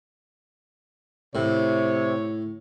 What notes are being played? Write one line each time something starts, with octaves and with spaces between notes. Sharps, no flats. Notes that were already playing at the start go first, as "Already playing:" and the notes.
A2 C3 C#5